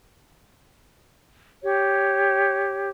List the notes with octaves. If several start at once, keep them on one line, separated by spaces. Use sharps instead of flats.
G4 C#5